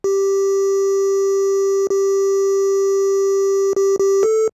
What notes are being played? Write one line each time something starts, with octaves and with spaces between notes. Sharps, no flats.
G4
G4
G4
G4
A4